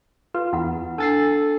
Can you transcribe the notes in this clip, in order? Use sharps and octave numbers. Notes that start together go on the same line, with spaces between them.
F4 B4
E2 E4 F4 F#5
D4 A4 A5 A6 C7